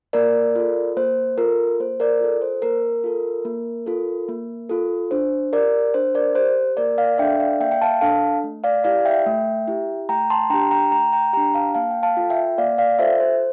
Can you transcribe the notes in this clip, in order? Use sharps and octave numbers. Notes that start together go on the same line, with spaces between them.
A#3 A#4 D5
F4 A4
A#3 C5
F4 A4 A#4
A#3 C5
A#4 D5
F4 A4
C5
A#3 A#4
F4 A4
A#3
F4 A4
A#3
F4 A4
D4 C5
G4 A#4 D5
D4 C5
A#4 D5
G4 C5
A#3 A#4 D5
D5 F5
D4 A4 E5 G5
D5 F5
A#3 E5 G5
G5
F5 A5
D4 A4 F5 A5
A3
D5 F5
E4 G4 D5 F5
E5 G5
A3
E4 G4
A3 G5 A#5
A5 C6
D4 G4 G5 A#5
G5 A#5
A3 G5 A#5
G5 A#5
D4 G4 G5 A#5
F5 A5
A#3 F5 A5
G5
F5 A5
F4 A4
E5 G5
A#3 D5 F5
D5 F5
F4 A4 C5 E5
C5